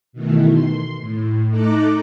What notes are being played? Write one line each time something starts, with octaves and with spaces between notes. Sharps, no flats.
B2 D#3 E3 A3
C6
A2
A3 D#4 A4 A#5 D6 F#6